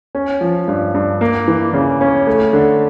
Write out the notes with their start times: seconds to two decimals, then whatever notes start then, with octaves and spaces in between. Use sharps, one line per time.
0.15 C#4
0.41 F3
0.68 G2
0.94 G2
1.21 A#3
1.48 E3
1.73 C#3
2.01 C#4
2.27 A3
2.53 D3